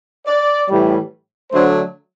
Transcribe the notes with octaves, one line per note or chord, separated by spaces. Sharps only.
D5
A2 E3 G3
D3 F#3 A3 D4 C5